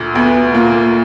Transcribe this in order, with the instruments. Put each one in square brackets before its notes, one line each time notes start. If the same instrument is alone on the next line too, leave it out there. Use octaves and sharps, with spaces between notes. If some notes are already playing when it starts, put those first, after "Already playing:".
Already playing: [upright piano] D2 A#2
[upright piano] D2 [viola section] B3
[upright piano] A#2 [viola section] A#3